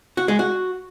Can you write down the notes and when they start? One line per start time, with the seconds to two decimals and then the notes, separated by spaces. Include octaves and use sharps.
0.17 F#4
0.28 G#3
0.39 F#4